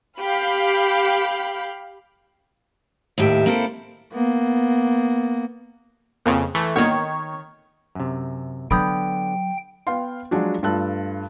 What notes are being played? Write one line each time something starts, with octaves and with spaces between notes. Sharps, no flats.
G4 F5 B5
D#2 A2 G4 E5
A#3 C4 E4 A4
A#3 B3
F2 C#3 A#3 C4
E3 A3
B1 G2 A#2 D#3 C#5
F#2 C3
D3 F#3 B3 G5 B5 D#6 G6
B3 F5 G5 C6
F3 F#3 G#3 D4 F#4
G2 A3 F4 A5 E6 F#6